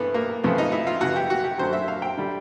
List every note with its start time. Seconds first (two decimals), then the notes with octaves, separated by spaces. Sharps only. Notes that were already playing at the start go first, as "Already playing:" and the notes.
Already playing: G2 E3 A3 B3
0.14 A#3
0.44 F2 C#3 F3 A3 B3
0.58 D#4
0.72 E4
0.87 F4
1.01 F#2 C#3 E3 F#4
1.16 G4
1.30 F#4
1.44 G4
1.58 F#2 D3 F#3 C5
1.73 E5
1.88 F5
2.02 G5
2.17 D3 G3